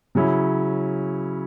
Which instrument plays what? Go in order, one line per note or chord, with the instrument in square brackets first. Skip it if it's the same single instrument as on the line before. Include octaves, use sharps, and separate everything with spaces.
[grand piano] C#3 F#3 C#4 E4